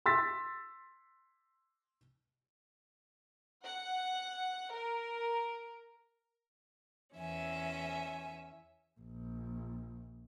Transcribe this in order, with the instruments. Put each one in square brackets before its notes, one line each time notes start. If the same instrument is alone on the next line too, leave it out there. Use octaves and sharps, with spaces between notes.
[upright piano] C6 E6 A6 B6
[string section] F#5
A#4
[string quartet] E2 C#4 E5 G#5
[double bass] A#1